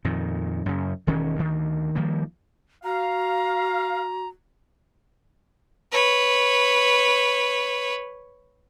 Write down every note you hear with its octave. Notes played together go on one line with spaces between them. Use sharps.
F2 A#2 D#3
F#2 C#3
E1 D#3 C#4
D2 D#3
D#3 F3 G3 A#3
F#4 F5 A#5
B4 C#5